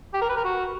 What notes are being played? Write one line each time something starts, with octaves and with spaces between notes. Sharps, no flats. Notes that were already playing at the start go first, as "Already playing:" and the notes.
G4
A#4
B4
A#4
F#4